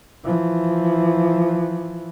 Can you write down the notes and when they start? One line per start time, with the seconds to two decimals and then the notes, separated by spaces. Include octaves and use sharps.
0.24 E3 F3